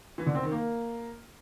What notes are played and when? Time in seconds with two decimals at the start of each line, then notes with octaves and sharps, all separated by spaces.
0.18 E3
0.26 D3
0.35 C4
0.43 D#3
0.51 A#3